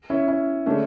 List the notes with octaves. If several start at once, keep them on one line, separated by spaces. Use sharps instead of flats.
C#4 E4
C#4 E4
D3 G#3 A3 C#4 D4